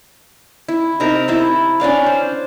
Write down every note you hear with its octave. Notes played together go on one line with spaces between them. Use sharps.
E4
C3 D#4 A#4 A#5
E4 A5 B5 C6
C#4 D4 D5 F5
C5